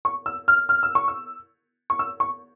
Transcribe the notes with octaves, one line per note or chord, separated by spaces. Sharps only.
C#6
E6
F6
F6
E6
C#6
E6
C#6
E6
C#6